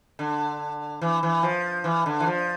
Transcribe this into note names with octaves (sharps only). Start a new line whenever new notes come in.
D3
E3
E3
F3
E3
D3
E3
F3